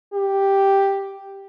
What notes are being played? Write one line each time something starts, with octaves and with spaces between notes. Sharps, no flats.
G4